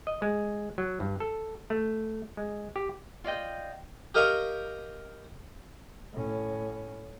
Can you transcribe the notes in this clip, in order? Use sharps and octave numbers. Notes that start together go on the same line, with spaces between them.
D#5
G#3
F#3
G2
A4
A3
G#3
G4
F4 D5 D#5 G5
G4 A#4 D#5 F5 G5 C#6
A2 C#4